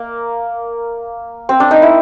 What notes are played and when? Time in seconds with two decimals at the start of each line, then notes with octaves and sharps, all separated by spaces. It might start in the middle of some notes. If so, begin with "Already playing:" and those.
Already playing: A#3
1.49 C4
1.60 D4
1.71 D#4
1.82 E4